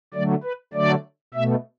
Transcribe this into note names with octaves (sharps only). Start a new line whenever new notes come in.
D3 F#3 A3 D5
B4
D3 F#3 A3 D5
B2 A3 E5